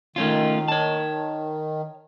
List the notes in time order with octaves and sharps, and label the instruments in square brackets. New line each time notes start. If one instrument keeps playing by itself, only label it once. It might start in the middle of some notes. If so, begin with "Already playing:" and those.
[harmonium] D#3 [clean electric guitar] A3 C#4 F4
[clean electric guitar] C#5 A5